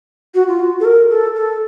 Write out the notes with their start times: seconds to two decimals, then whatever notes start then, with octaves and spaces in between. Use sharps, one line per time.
0.35 F#4
0.48 F4
0.59 F#4
0.80 A4
0.85 A#4
1.10 A4
1.36 A4